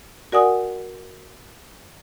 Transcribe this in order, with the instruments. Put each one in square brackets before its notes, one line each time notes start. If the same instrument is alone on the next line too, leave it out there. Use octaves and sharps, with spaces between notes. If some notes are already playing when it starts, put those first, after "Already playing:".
[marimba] F#4 A#4 D5 F#5 G#5 D#6